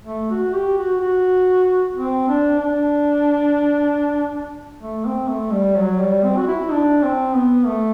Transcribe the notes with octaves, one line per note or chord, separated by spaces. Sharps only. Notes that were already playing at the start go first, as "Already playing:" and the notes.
A3
F#4
G4
F#4
F#4
C4
D4
D4
A3
C4
A3
G3
F#3
G3
C4
F#4
E4
D4
C4
B3
A3